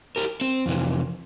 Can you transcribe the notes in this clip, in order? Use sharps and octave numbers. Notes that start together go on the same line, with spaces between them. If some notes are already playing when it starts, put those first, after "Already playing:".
G4 A#4
C4
F2 C3 E3